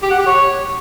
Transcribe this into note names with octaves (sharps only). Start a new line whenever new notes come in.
G4
F#5
G4
C#5